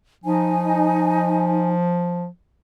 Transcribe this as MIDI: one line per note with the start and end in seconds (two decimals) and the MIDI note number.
0.24 2.27 53
0.24 1.71 63
0.24 1.71 80